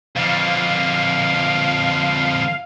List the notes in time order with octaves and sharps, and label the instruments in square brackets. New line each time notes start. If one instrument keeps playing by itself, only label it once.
[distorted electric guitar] F2 D3 [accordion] F5